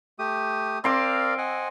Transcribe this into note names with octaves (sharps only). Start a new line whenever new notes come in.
A3 G4 D#6
C4 A#4 D5 F5 C6 D6
D#5 F#5 G#5